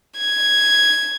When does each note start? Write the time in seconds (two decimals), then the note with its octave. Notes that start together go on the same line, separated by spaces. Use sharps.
0.18 G#6